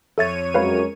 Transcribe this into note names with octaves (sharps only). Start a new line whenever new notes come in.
F2 A4 C#5 E5 A6 D#7
F#2 G#3 C#4 A#4 B4 F5 B5